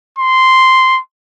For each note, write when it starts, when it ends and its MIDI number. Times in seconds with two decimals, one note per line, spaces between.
0.19 1.00 84